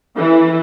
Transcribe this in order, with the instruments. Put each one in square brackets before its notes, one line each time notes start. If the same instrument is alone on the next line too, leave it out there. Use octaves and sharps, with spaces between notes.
[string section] E3